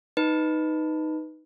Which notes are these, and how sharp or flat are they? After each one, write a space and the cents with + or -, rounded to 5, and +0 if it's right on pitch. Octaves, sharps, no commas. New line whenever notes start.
D#4 +0 B4 +5